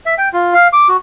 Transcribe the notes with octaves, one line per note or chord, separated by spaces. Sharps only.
E5
G5
F4
F5
D6
F#4